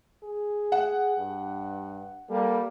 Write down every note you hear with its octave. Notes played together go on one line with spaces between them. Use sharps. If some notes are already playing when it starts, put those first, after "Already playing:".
G#4
F#5
G2
G3 A#3 A4